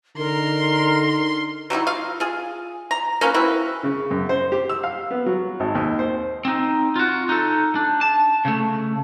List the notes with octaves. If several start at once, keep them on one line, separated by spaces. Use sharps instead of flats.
D3 D#4 A#4 C6
F#3 G3 D#4 E4
F4 F5
F4 G#4
A#5
A#3 C#4 F4 B4
C4 E4 F#4 B4
C#3
F#2
C5
G4
E6
F5
B3
F#3
G#1
D#2
C5
C4 D#4
F4 F#4
D#4 A4
D4
A5
C#3 A3